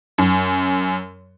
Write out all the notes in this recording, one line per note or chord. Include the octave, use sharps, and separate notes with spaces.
F#2